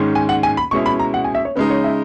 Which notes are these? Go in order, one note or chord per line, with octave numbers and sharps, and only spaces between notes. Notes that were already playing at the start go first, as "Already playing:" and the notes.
Already playing: G#2 D#3 G#3 C#4
G#5
F#5
G#5
B5
B2 G#3 C#4 E4 C#6
B5
A#5
F#5
G#5
E5
C#5
C#3 G#3 D#4 B4
C#5
E5